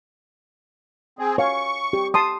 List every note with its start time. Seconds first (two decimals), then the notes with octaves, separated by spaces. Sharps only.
1.19 C4 G#4
1.38 C#5 F5 G#5 C#6
1.93 G4
2.14 A5 C6 D#6